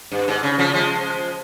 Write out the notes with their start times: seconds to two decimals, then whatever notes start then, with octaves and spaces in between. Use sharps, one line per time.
0.11 G2
0.28 G#2
0.43 C#3
0.58 C#3 F3
0.74 F3 G#3